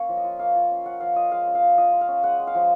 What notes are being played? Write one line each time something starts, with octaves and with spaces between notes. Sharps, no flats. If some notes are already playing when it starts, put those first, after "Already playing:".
Already playing: A#3 C#4 C#5 F5
F3
D#5
F4
A#3 F5
F4
C#4
C#4 F#5
F3 F5
F4 D#5
G#3 F5
C#4
F5
F4
F4 D#5
F4
F5
C#4
G#3 F#5
G#3
F5
F3